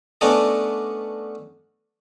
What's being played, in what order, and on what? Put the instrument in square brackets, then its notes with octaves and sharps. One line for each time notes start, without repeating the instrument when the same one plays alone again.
[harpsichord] A3 B3 C#4 D4 D5 D#5